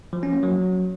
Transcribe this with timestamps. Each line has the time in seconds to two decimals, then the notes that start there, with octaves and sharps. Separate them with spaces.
0.13 F3
0.23 C#4
0.33 A#3
0.43 F#3